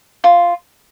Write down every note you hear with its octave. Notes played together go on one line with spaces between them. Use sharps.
F4